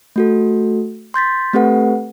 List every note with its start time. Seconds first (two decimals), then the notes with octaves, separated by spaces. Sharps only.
0.16 A3 F#4 A4
1.14 C6 G6 A6 B6
1.53 A3 C4 G4 A4 B4 F#5